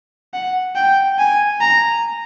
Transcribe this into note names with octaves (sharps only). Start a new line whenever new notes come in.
F#5
G5
G#5
A#5